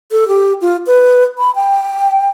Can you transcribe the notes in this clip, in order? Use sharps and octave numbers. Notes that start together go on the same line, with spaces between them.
A4
G4
F4
B4
B5
G5